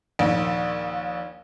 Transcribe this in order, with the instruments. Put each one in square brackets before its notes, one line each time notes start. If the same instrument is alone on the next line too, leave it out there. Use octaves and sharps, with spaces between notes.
[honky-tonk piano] A#1 D#2